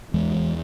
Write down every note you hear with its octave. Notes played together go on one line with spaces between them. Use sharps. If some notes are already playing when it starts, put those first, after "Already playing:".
E2 E3 G#3
E2